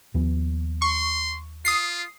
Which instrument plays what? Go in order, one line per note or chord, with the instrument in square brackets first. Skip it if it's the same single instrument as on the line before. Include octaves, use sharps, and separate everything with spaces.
[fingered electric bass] D#2 F3 B3
[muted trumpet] C6 [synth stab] C#6
[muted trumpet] F4 [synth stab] D#6 C7